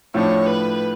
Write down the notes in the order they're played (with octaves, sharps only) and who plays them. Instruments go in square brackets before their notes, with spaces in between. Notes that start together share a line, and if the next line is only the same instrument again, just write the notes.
[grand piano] A2 F3 A3 D4 [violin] C#5
[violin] B4